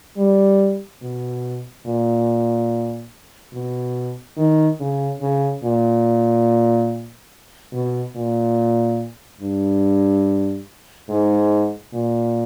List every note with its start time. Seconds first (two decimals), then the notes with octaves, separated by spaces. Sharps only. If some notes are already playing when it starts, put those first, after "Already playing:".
0.17 G3
1.02 B2
1.86 A#2
3.53 B2
4.37 D#3
4.80 C#3
5.21 C#3
5.63 A#2
7.73 B2
8.15 A#2
9.41 G2
11.09 G#2
11.93 A#2